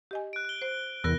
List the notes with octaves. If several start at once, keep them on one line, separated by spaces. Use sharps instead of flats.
G4 D#5 G#5
F#6 D7
F#6 G7
C5
E2 C3 B3 A#4 F#6 A#6